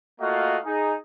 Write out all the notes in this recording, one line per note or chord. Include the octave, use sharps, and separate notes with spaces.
A3 A#3 F4 F#4 D#5 F5
D#4 G#4